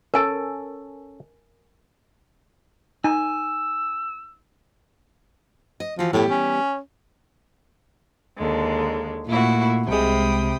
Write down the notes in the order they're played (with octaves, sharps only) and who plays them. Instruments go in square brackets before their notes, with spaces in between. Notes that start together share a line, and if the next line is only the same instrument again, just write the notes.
[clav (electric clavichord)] C#4 A4 [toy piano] A#4 G#5
[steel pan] D#4 [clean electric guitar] G#5 [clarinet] E6
[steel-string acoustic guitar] D#5
[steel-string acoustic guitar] E3 F#4 [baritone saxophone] F3
[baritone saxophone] A2 [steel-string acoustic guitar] G3 B3 G4
[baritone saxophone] C#4
[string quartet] D#2 D3 G#3
[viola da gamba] A#2 [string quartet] A3 E4 F#4
[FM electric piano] C2 G#3 [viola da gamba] C3 [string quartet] G5 B5 D#6